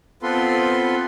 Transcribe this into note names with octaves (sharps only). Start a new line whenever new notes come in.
B3 C4 F4 A4 B4 C6